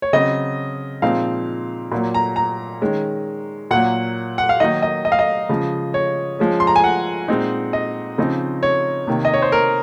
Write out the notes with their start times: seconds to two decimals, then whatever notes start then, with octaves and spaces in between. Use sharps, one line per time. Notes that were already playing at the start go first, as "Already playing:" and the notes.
0.02 C#5
0.13 C#3 F#3 C4 D#5
1.02 A#2 F3 G#3 C4 D#4 F5
1.92 A#2 F#3 A#3
2.14 A#5
2.36 A#5
2.81 D#3 G#3 C#4
3.71 A#2 F#3 A#3 F#5
4.38 F#5
4.49 F5
4.60 D#3 F#3 A#3 D#4 D#5
4.82 D#5
5.05 D#5
5.12 F5
5.19 D#5
5.49 C#3 F3 G#3
5.94 C#5
6.39 F3 G#3 C#4
6.60 C6
6.67 A#5
6.76 G#5
6.84 F#5
7.28 A#2 G#3 C4 D#4
7.73 D#5
8.18 C#3 F3 C4 D#4
8.63 C#5
9.07 C3 D#3 A#3
9.25 D#5
9.34 C#5
9.42 C5
9.52 A#4